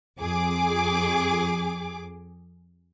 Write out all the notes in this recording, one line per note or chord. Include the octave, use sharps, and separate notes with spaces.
F2 G#4 D6